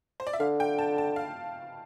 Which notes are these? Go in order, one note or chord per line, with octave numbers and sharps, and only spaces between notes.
C5
D5
E5
D3 F5
G5
A5
A5
F5